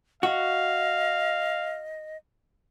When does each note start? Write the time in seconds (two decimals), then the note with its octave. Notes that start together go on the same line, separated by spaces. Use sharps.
0.23 F#4 D#5 F5